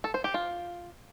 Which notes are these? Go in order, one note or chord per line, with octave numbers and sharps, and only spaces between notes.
A4
C5
G4
F4